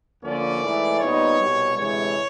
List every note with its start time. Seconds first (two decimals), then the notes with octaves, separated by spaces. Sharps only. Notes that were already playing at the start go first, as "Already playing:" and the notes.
0.24 D2 D3 F3 A#3 C#4 D5
0.62 G#2 E3 A3
1.00 A#2 G3 B3 D#4 C#5
1.38 C2 B2 G3
1.76 D2 C3 E3 G#3 C#5